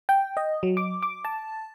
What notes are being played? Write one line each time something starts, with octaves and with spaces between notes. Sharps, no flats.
G5
D#5
F#3
D6
D6
A5